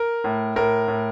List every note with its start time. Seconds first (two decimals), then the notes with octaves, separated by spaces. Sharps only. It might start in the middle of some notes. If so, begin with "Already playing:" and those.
Already playing: A#4
0.24 A2
0.56 A2 A#4
0.88 A2